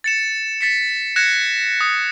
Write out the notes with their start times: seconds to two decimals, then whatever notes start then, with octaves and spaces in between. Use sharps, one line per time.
0.04 A6 C#7 E7
0.61 A6 B6 C#7
1.16 F#6 G#6 A#6 C#7 E7
1.81 D#6